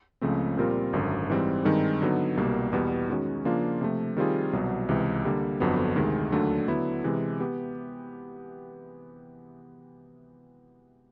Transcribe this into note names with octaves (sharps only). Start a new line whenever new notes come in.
C#2 C#3 F3 A3 C4
A#2 G3 C4 F4 A#4
G#1 F#2 D3
G#2 E3 G3 C4
G2 D#3 G#3 C4 D#4
D3 F#3 B3 D#4
C2 B2 G3 A#3
E2 B2 G3 B3
D#3 G#3 C#4 F#4
C#3 F3 A#3 D4 F4
C3 F3 A3
D#3 G3 C4 F4 G#4
C2 B2 F#3
C#2 C3 E3
D3 G3 A#3
G1 F2 D3 F#3 B3
D2 C3 D#3 G#3
D#2 D3 F#3 A3 D4
D3 F#3 B3 E4
C3 E3 G#3
B3 G4